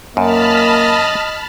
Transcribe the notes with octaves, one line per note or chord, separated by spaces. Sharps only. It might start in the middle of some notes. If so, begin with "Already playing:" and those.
F#2 A#3 D#5 A5 B5 F6